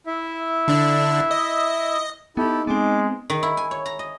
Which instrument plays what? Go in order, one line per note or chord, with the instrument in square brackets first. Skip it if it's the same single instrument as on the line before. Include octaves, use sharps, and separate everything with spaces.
[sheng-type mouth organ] E4 E5
[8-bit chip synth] D3 D4
D#5
[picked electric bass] B3 [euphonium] D#4 [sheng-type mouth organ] E4 G4 A4
[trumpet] G#3 [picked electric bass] B3 C4 [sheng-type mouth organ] D6
[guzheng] D#3
E4
G#5
C#5
A#5
D#5